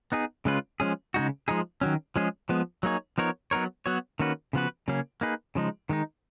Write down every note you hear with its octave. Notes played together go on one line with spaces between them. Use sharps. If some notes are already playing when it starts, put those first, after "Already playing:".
B3 D#4 G#4
C#3 G#3 C#4 F4 B4
F3 G#3 C#4 G#4
C#3 G#3 D#4 F#4
F3 G#3 D#4 G#4
D#3 F#3 C#4
F3 G#3 C#4 G#4
F3 G#3 B3
F#3 A#3 D#4 G#4 C#5
F3 B3 D#4 A#4 C#5
F#3 B3 D#4 A#4 C#5
F#3 B3 F#4 C#5
D#3 A#3 C#4 F#4 B4
C#3 F3 B3 F#4 B4
C#3 F#3 A#3 C#4 G#4
A#3 D#4 G#4 B4
C#3 F3 G#3 D#4
D#3 G#3 D#4